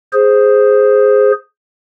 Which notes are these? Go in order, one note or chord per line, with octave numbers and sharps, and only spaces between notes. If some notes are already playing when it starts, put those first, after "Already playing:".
G#4 C5